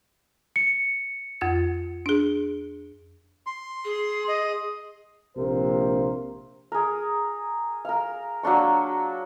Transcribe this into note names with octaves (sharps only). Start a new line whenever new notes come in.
C#7
F2 F4 A6
D4 G#4
C6
G#4
D#5
A#1 C3 A#3 A#4 C5
G#4 A#4
A#4 F5
F#3 A#3 D4 C#6